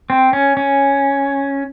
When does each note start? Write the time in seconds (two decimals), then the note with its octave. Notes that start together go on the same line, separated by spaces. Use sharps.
0.10 C4
0.33 C#4
0.57 C#4